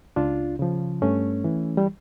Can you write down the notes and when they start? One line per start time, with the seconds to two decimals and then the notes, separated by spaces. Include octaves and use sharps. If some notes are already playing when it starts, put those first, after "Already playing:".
0.16 C#2 D4 F4
0.59 C#3 F3
1.02 G2 A3 C#4
1.44 E3
1.77 G3